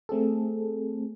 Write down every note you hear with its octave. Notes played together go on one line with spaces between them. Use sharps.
A3 C4 G#4 A4